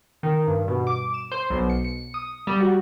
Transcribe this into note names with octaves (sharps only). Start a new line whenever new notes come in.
D#3
G2
B2
D6
E7
C5
B1
C#7
C#7
D#6
G3
F#4